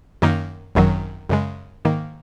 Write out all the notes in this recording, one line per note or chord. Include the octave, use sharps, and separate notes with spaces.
F#2 D#3 A#3 D#4
G#1 F#2 D#3 F#3
F#2 C#3 G#3
G#2 D#3 A#3